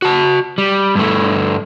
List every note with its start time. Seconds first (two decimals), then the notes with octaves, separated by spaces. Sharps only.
0.02 F#4 A5
0.58 G3
0.95 G2 A3